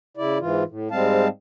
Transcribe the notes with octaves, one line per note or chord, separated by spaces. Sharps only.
C#3 E4 D5
G#2 E3 F4
A2
G#2 G3 G#3 C4 F5 A5